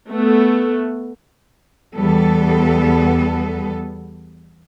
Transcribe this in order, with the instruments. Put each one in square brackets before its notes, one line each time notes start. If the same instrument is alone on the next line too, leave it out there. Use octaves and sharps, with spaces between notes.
[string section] A3 B3
[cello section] E2 G3 B3 A4